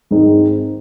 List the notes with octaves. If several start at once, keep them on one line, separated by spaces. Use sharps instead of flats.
G#2 D#3 G#3 C4 D#4